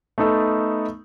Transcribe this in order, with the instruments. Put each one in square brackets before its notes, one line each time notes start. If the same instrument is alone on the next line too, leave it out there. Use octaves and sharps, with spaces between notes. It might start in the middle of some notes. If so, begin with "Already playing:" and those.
[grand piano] A3 B3 D#4 A4